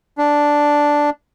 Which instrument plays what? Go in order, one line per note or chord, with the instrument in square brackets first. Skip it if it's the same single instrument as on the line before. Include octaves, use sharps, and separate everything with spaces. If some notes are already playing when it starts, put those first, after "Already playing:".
[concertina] D4